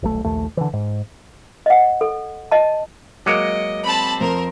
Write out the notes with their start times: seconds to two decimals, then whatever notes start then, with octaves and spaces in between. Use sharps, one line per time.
0.03 D#1 B1 A3
0.24 A#1 D#2 A3
0.57 D3 E3
0.73 G#2
1.66 D#5 F#5
2.01 A4
2.51 D#5 A5
3.26 F#3 G#3 A#3 D#5 D6 C#7 D7
3.84 C4 C5 A5 B5
4.21 F2 A#4